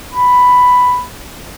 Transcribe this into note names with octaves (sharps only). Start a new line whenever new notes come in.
B5